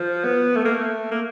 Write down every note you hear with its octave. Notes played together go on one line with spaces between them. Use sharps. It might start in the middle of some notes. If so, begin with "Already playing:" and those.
Already playing: F3
B3
A3
A#3
A3
A#3